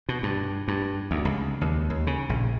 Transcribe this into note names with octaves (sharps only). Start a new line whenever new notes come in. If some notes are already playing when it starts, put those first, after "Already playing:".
B2
G2
G2
D2
C#2
D#2
D#2
C#3
A#1